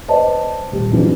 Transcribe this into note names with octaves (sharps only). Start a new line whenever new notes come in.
B4 C5 D5 D#5 A5
D#1 G4
G#2 C3 E3 F#3 D4